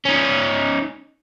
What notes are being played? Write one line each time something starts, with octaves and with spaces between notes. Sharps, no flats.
C#4 D#4